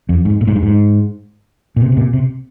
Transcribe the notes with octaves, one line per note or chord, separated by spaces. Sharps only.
F2
G#2
A#2
G#2
G2
G#2
A#2
C3
C3
A#2
C3